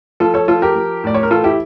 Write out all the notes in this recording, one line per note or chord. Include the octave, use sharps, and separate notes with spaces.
F3 F4 A4
A4 C#5
F3 F4 A4
G4 A#4
F3
A2 D5
C#5
A#4
E3 F4 A4
E4 G4